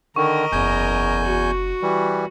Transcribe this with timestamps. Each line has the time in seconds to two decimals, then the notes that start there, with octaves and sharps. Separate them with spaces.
0.16 D3 D#3 A#4 D#5 C#6
0.52 F#1 E2 G#5 G6
1.24 F#4
1.82 E3 G3